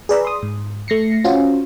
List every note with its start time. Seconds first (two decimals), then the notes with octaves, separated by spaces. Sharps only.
0.09 G#4 B4 D5 A#5 B5 E6
0.25 C6 D#6
0.43 G#2
0.88 A3 A#6 C7 C#7
1.24 C#4 F4 F#4 C5